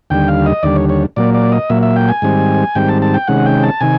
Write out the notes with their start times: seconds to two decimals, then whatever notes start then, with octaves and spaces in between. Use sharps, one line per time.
0.10 D#2 D3 G3 G5
0.28 F5
0.46 D#5
0.63 D#2 D3 G3 D5
0.76 C#5
0.89 C#5
1.16 A#2 F#3 A#3 D5
1.34 D5
1.52 D#5
1.70 A#2 F#3 A#3 E5
1.83 E5
1.96 G5
2.09 G#5
2.22 G#2 D#3 G3 C4
2.75 G#2 D#3 G3 C4 G5
2.89 A5
3.02 A5
3.14 G5
3.28 C3 D#3 G#3 C#4 F#5
3.46 G5
3.63 A5
3.80 C3 D#3 G#5